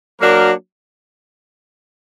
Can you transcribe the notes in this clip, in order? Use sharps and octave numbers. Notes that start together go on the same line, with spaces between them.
F#3 A#3 D4 F#4 A#4